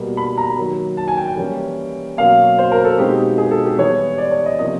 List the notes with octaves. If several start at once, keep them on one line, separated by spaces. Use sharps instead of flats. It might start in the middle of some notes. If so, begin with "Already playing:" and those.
Already playing: B2 G3 A#3
B5
A#5
D#3 F#3 A#3
A5
G#5
G5
G5
E3 G3 A#3 C#4
B2 F#3 A#3 C#4 F5
C5
A#4
A4
B2 G#3 C4 D#4 G4
G#4
A4
G4
E3 G3 B3 C#5
D5
C#5
D#5
C3 F3 A#3 C#4 D#5